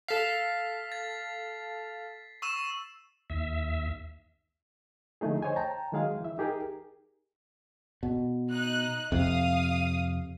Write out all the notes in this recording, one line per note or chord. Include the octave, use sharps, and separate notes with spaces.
A4 F5 B6 C7
A6
C#6 E6 E7
D#2 E5
D3 F3 A3 D#4 G#4
C5 C#5 D#5 G#5
G5 A5 A#5
D#3 F#3 G#3 G#4 F5
E3 E5
D#4 G4 G#4 A#4
B2
D#4 F#6
F2 C3 F5 D#6